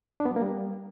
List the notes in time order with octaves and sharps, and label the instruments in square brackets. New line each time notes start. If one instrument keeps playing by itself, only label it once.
[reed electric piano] D4
B3
F#3
A#3
G3